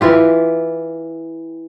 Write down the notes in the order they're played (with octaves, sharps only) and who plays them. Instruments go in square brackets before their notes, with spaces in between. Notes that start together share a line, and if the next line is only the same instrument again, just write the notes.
[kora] E3 E4 F4 G4